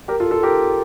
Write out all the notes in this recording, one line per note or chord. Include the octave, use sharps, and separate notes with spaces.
G4 A#4
F4 A4
F4 A4
G4 A#4